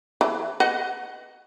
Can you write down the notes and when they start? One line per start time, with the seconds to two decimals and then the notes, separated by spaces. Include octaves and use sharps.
0.21 E3
0.60 B4 D#5 F#5